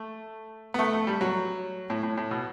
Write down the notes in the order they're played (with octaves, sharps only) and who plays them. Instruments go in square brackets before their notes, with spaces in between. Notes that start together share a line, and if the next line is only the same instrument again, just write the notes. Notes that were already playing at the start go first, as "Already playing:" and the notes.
Already playing: [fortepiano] A3
B3
A3
A3
G3
F#3
A2
A2
A2
B2